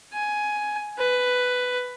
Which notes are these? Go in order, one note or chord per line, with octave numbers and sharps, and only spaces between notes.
G#5
B4